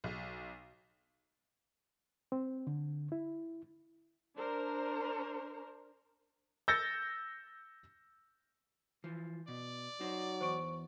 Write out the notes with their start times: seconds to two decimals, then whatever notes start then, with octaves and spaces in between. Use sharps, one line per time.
0.04 B1
2.32 C4
2.67 D3
3.12 E4
4.36 D4 A#4 C5
6.68 E6 G6 A6 A#6 C#7
9.04 E3 F3
9.48 B2 D5
10.01 F#3 D#4 C5
10.41 E2 C5 C#6 D7